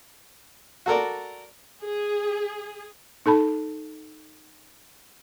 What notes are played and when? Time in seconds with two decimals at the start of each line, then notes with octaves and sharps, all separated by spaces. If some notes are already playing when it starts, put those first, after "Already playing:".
0.86 F#4 A4 A#4 D5
1.82 G#4
3.26 D#4 A4 A5 B5